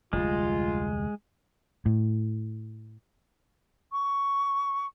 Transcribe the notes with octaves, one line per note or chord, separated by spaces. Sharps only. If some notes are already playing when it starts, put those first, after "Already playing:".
F1 D2 G3 G#3 F4
A2
C#6